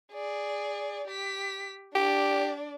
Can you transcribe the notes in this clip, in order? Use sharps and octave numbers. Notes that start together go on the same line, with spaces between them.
G#4 D5
G4 B6
D4 G4 D5